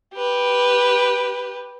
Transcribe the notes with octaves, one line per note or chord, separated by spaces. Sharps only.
G4 B4